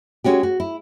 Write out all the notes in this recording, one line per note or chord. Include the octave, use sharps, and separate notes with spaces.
G#3 C#4 F#4 G4
F#4
E4